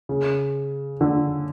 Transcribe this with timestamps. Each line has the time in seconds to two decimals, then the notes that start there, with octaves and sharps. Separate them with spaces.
0.09 C#3
1.01 D3